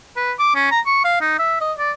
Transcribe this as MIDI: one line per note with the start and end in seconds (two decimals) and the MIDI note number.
0.17 0.32 71
0.39 0.54 86
0.55 0.71 61
0.71 0.81 82
0.86 1.03 85
1.04 1.20 77
1.21 1.34 63
1.39 1.58 76
1.61 1.72 75
1.78 1.92 74